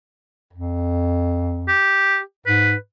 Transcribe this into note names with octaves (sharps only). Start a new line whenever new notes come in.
F2
G4
G#2 B4